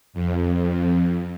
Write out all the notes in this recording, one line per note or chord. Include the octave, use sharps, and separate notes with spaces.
F2